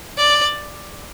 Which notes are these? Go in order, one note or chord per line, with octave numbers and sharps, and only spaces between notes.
D5